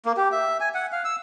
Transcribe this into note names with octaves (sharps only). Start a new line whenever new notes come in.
A#3
G4
E5
G#5
F#5
F5
E6